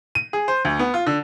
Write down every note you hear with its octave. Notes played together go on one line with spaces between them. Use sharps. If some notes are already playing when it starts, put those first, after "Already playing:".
D#7
G#4
C5
D2
B3
F4
D3